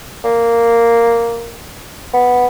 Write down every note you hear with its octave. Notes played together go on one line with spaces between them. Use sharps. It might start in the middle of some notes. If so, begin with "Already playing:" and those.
A#3
B3